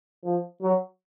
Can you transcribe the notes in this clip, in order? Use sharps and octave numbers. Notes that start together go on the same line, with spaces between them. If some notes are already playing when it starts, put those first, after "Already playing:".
F3
F#3